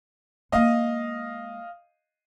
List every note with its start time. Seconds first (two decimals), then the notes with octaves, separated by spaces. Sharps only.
0.52 G#3 A#3 D#5 F5 D#6